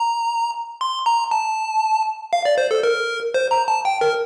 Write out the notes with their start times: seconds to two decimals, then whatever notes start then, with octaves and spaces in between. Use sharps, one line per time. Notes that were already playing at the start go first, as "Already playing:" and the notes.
Already playing: A#5
0.81 C6
1.06 A#5
1.31 A5
2.33 F5
2.45 D5
2.58 C5
2.71 A4
2.83 A#4
3.34 C5
3.51 A#5
3.68 A5
3.85 G5
4.01 A#4